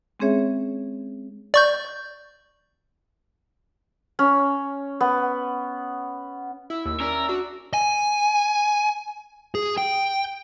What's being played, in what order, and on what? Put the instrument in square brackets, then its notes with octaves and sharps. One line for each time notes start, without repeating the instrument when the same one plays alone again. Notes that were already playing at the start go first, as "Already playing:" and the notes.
[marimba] G#3 C4 C#4 G#4 C#5 E5
[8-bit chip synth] D5 C#6 G6
[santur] C#4
B3
[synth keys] E4 [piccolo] E6
[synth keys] D#2 [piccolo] E6
[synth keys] C#4 D5 E5 [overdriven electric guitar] A#4
[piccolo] E6
[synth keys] D4 F#4
[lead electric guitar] G#5
G#4
G5